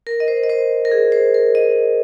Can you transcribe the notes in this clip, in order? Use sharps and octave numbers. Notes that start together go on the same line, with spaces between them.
A#4
D#5
C5
D#5
C5
A#4
G#4
C5
A#4
D#5